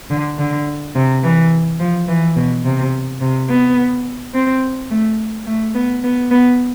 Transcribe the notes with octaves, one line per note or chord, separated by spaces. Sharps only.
D3
D3
C3
E3
F3
E3
B2
C3
C3
B3
C4
A3
A3
B3
B3
B3